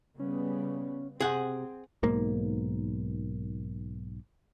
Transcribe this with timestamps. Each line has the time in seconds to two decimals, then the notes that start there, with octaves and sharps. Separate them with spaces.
0.19 C#3 G3 B3 C#4
1.20 C3 C4 G#4 F#5
2.03 B1 G#2 A#3